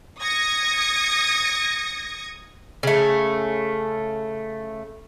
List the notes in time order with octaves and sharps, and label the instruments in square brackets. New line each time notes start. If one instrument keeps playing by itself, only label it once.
[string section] D#6 G#6 A#6 C#7
[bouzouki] C#3 A3